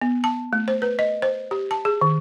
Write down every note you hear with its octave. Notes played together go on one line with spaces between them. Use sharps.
B3
A5
A3
C5
B4
D#5
C5
G4
A5
G#4
D#3